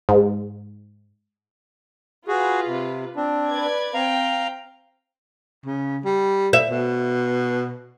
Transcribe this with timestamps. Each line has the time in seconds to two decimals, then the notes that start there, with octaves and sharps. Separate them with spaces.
0.09 G#2
2.28 F4 F#4 G#4 B4
2.66 C3
3.16 C4 D4
3.50 B4 D5 G#6
3.94 C4 F5 G5 A#5
5.65 C#3
6.05 G3
6.53 E5
6.70 B2